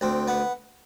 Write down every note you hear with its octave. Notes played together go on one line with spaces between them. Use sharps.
D2 C4
B3